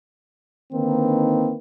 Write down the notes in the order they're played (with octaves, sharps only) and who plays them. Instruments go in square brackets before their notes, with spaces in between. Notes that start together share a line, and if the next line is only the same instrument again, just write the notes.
[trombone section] D3 D#3 A#3 C4 D#4 B4